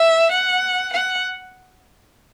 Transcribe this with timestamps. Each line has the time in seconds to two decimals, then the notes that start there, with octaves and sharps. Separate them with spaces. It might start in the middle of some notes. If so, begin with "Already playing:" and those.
Already playing: E5
0.32 F#5
0.93 F#5